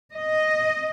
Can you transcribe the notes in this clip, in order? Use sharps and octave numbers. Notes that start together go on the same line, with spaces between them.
D#5